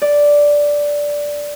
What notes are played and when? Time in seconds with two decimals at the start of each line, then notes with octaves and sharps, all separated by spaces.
0.02 D5